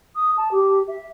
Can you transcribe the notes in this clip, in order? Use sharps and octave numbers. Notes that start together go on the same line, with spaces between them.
D#6
A5
G4
E5